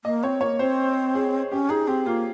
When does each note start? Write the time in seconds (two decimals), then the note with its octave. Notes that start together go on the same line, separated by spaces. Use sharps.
0.04 A#3 D#5
0.23 C4 C#5
0.41 A#3 C#5
0.59 C4 C5
1.14 G#4
1.51 C#4 G4
1.69 D#4 G#4
1.88 C4 G4
2.06 A#3 F4